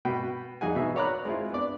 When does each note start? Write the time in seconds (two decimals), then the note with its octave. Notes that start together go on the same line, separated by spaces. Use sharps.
0.05 B2 B4 G5
0.61 F2 D#4 G#4 F#5 G#5
0.75 B2 B3 D#4 E5
0.95 F#4 C#5 D5 A#5 B5 F#6
1.25 G#3 C4 E4 F4
1.52 B3 D4 D5